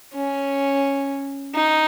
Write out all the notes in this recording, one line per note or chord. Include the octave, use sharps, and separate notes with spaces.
C#4
D#4